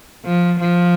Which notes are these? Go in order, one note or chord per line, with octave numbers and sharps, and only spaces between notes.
F3
F3